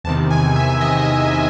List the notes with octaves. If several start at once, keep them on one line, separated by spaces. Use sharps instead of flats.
E2 C3 D#3 A5
G#5
E5
D#5